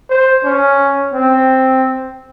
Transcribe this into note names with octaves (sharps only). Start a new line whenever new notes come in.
C5
C#4
C4